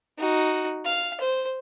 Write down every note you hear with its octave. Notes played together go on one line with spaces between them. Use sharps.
D#4 F#4
F5
C5